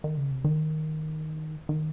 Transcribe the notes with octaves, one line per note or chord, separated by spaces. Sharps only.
D#3
C#3
C3
D#3
D#3